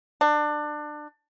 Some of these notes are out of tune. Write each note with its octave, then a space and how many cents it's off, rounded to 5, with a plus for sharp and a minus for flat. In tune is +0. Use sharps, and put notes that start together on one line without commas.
D4 +25